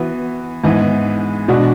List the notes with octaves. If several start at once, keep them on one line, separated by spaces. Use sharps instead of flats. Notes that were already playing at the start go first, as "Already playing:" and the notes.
Already playing: E3 B3 F#4
G#2 E3 G#3 B3
B2 G#3 D4 F#4